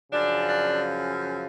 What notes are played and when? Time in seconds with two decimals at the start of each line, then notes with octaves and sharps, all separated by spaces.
0.11 F#2 C#3 F3 D4
0.48 D4